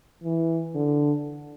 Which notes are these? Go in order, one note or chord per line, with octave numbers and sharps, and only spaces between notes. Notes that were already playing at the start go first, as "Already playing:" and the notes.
E3
D3